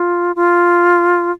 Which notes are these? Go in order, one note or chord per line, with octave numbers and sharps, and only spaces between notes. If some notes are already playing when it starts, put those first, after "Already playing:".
Already playing: F4
F4